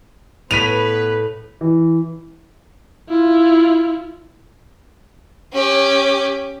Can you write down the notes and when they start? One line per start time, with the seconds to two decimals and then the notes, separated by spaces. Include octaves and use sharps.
0.51 A2 B3 B4 B6 D#7 F7
1.61 E3
3.09 E4 F4
5.53 C#4 G4